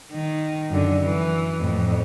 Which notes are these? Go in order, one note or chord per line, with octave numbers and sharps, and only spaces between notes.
D#3
F#2 D3
E3
F2 A2